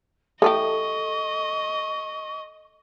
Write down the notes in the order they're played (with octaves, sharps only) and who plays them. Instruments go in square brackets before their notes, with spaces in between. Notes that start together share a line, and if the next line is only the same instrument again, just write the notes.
[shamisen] E3 A3 G4 [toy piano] A4 [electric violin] D#5 [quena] C#6